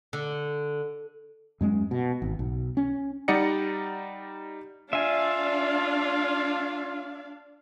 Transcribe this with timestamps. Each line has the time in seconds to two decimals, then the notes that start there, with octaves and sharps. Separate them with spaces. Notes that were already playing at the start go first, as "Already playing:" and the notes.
0.13 D3
1.61 F#2 G#3 B3 C#4
1.91 B2
2.22 G#1
2.39 B1
2.77 C#4
3.28 G3 D#4 D5 D#5 F#5 C#7
4.93 D4 F4 D5 E5 F5 G#5